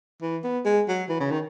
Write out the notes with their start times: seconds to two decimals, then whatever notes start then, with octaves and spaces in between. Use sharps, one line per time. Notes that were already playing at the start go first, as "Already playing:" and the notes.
0.22 E3
0.44 B3
0.65 G#3
0.88 F#3
1.09 E3
1.20 C#3
1.31 D#3